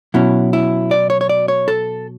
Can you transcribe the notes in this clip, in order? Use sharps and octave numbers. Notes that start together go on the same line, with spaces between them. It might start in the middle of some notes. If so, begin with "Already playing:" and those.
B2 F#3 C#4 E4
E4
D5
C#5
C#5
D5
C#5
A4